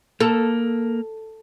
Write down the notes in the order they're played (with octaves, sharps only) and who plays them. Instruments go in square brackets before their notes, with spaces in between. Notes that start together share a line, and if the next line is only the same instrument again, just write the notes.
[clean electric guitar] A#3 [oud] A4